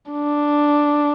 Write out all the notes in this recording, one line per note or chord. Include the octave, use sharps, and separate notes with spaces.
D4